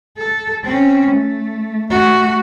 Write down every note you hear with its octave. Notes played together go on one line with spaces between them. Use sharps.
A4
C4 C#4
A3
A3 F#4